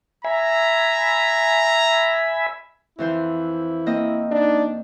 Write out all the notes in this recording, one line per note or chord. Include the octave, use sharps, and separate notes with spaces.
E5 G#5 A#5 B5
F2 E3 E4 C5
A#3 C4 D#5
D4 D#4